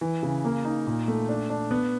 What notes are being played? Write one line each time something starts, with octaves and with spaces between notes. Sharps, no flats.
E3
C#3
A#3
D#4
A#2
A3
D4
D4
B3